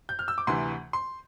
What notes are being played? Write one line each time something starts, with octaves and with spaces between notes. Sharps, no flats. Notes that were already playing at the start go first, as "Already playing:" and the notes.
G6
F6
E6
D6
D2 C3 E3 C6
C6